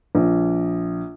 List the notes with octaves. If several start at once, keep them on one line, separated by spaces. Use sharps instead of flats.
A#1